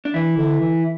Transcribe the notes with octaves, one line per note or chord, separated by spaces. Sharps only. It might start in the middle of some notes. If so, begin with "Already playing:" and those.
D4
E3 E4
D3
E3